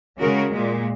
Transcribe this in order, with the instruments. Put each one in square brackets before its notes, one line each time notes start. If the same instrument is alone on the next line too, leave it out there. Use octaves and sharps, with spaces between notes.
[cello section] C#3 G#3 F#4 A#4
A#2 G#3